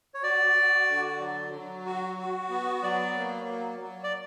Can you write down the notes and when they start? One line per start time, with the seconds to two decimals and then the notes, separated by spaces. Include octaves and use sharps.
0.14 C#5
0.23 F#4 D5
0.55 F#4
0.88 D3
1.20 F#3
1.53 F#3
1.85 F#4
2.18 F#4
2.50 B3
2.83 F#3 D5
3.15 A#3
3.47 F#3
3.80 F#3
4.04 D5